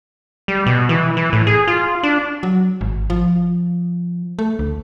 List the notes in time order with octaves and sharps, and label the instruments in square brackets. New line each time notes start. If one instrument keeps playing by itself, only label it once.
[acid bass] G3
B2
E3
E3
A2
G#4
F4
D4
[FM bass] F#3
G#1
F3
A3
D2